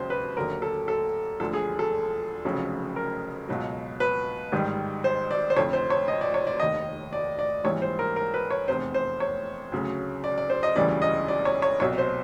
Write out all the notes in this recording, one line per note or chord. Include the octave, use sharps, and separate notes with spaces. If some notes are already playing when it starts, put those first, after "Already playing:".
Already playing: E1 D#2 C#3 F#3 C5
B4
D#2 D3 F#3 A#4
A4
A4
E1 D2 D3 F3 A4
G#4
A4
F1 F2 C#3 F#3
A#4
C#2 B2 F#3
B4
A1 G#2 D#3 G3
C5
D5
C5
F1 F2 D3 F3 C#5
C5
C#5
D#5
D5
C#5
D5
F1 D#2 D#3 D#5
D5
D5
A#1 G#2 E3 G3 C#5
C5
A#4
A#4
B4
C#5
F1 E2 C3 C5
C5
C#5
D2 C#3 F#3
D5
D5
C5
D#5
E1 D2 C#3 E3 G3 D5
D#5
D5
C#5
C#5
C2 B2 F#3 C#5
C5